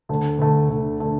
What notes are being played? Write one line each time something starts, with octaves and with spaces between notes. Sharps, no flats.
D2 D3 A3
D2 D3 A3
D2 D3 A3
D3 A3